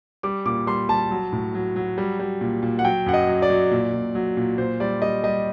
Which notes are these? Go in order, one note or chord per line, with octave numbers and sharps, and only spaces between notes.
G3 D6
A#2 D6
G3 C6
G3 A5
F#3
A2
F#3
F#3
G3
G3
A#2
A#2
F#5
F#3 G5
F#2 F#5
D#5
F#3
D5
F#3
A#2
A#2
F#3
A#2
A#2 C5
G3 D5
G3 D#5
G3 D#5